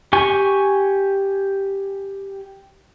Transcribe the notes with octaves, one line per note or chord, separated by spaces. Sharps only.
G4 G#5 C#6